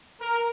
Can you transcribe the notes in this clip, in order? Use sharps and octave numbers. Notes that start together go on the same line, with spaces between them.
A#4